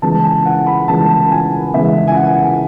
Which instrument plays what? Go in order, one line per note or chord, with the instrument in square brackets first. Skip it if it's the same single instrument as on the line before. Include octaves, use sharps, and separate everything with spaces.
[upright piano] C#3 E3 G#3 A5
G#5
F#5
B5
C#3 E3 G#3 A5
G#5
C#3 E3 G#3 E5
G#5
F#5